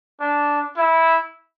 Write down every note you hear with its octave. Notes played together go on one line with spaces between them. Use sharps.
D4
E4